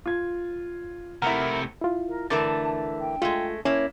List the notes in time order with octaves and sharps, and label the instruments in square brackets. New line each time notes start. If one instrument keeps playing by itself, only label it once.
[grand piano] F4 G#6
[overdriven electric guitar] C3 A3 [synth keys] E4 A#4 [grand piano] F#5
[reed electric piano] E4 F4
[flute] A#4
[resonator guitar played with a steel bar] D3 E3 A3 [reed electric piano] A#4 D6 A6 [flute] A5
[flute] G5
[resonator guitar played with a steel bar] G#3 A3 [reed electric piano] F4
[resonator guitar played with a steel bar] A#3 E4 [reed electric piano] C#4 [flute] C#5